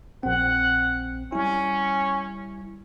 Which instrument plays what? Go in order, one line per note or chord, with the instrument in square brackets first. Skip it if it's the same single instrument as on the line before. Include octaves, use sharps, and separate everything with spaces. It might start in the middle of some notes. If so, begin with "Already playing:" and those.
[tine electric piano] A#1 C4 [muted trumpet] F#5
[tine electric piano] G3 E4 [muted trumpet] C#4